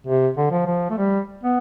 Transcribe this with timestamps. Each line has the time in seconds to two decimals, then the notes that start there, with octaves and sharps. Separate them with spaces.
0.07 C3
0.37 D3
0.51 F3
0.66 F3
0.90 A3
0.98 G3
1.43 B3